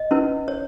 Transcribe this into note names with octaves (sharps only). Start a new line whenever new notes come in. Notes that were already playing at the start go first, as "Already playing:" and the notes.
Already playing: D#5
C#4 E4 B4
C#5